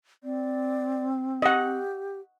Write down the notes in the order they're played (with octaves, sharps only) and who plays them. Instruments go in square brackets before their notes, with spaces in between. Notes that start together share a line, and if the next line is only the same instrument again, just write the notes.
[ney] C4 [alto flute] D5
[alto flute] G4 [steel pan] D#5 F#5